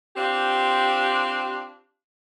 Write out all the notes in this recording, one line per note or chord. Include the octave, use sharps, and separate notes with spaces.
C4 D4 F4 G4